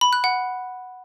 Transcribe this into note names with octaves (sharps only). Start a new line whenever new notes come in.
B5
F#6
F#5